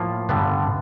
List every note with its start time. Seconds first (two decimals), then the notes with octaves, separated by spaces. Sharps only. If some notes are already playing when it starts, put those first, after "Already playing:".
Already playing: A2 F3 A#3 F4
0.29 G2 D3 G3 B3 D4